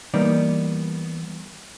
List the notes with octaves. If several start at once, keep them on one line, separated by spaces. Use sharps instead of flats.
E3 G3 A#3 B3 D#4 D5